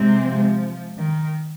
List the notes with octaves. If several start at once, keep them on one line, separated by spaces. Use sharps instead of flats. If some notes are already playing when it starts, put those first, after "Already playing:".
Already playing: C3 G#3 C4
F3
D#3